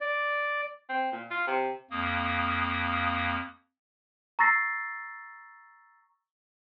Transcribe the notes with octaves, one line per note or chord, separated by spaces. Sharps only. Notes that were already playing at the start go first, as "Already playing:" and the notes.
D5
C4
A#2
F4
C3
F2 A#3 D#6
A#5 C#6 E6 A6 A#6 C7